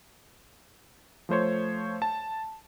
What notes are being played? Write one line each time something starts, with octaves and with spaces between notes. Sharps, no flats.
F3 A3 C5 C#5
A5